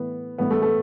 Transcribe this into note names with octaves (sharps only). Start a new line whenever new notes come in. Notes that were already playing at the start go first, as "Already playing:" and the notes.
Already playing: A2 E3 B3
A2 E3 B3
A3
A3